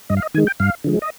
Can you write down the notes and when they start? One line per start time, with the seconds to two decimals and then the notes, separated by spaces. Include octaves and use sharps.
0.10 G2 D#5
0.17 F5
0.22 D#5
0.34 D#3 G#5
0.38 G#3
0.47 G5
0.60 G2 F5
0.84 D3 F3 G#3
1.02 D#5